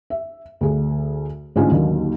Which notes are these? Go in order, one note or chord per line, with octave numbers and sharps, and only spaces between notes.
E5
D2 G#4
A1 G#2 D3 C#4 F4 G#5
D#2 D3 D#3 F#3 A#3